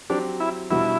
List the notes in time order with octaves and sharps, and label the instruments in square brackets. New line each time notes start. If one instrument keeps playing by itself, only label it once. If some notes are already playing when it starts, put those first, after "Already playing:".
[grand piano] F#3 C4 G4 [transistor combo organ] D4
[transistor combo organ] E4
[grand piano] B2 G3 D4 F#4 [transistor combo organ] E4